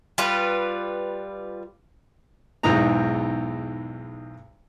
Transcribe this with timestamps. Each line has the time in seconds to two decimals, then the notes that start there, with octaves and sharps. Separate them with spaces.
0.18 G3 F4 B4
2.63 B1 E2 G#2 D#4 A#5